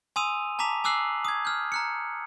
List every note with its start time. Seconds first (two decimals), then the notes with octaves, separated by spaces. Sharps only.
0.16 G#5 C6 D#6 E6 D#7 F7
0.59 A5 A#5 D6 B6 F7
0.84 G#5 D6 E6 F#6 C7 F#7
1.25 D#6 G#6
1.45 F6 G6
1.72 A#5 F#6 C#7